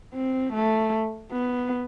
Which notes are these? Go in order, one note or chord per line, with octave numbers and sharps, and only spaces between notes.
C4
A3
B3